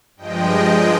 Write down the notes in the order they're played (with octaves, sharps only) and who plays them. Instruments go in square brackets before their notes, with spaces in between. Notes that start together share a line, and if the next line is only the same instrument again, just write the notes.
[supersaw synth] G2 F3 G#3 D#5 G5